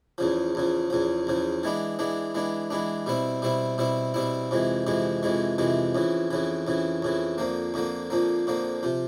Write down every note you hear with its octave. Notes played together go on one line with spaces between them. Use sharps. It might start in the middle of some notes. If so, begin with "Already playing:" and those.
E2 C#3 F3
E2 C#3 F3
E2 C#3 F3
E2 C#3 F3
E3 G#3 B3 D4
E3 G#3 B3 D4
E3 G#3 B3 D4
E3 G#3 B3 D4
B2 G3 C4 E4
B2 G3 C4 E4
B2 G3 C4 E4
B2 G3 C4 E4
F2 C3 E3 G#3
F2 C3 E3 G#3
F2 C3 E3 G#3
F2 C3 E3 G#3
F2 C#3 E3
F2 C#3 E3
F2 C#3 E3
F2 C#3 E3
F2 D3 F3 A#3
F2 D3 F3 A#3
F2 D3 F3 A#3
F2 D3 F3 A#3
C3 F3